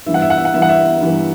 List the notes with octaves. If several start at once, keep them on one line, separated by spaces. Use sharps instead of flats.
G2 E3 E5
F#5
E5
F#5
E5
F#5
G2 E3 E5
F#5
E5
G2 E3